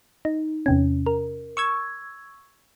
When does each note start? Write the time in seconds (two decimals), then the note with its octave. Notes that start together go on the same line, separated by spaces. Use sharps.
0.25 D#4
0.66 E2 C3 C#4
1.06 A#4
1.57 C#6 E6 G#6